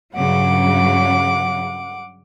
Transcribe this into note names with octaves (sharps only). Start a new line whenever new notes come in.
G2 C#3 F#3 F#5 D6